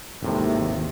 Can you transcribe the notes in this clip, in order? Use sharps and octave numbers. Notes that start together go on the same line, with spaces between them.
G#1 D#2 A2 C3